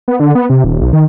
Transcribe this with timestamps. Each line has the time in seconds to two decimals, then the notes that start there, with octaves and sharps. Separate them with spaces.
0.08 B3
0.20 D3
0.35 B3
0.50 C3
0.64 D#1
0.81 B1
0.93 D#3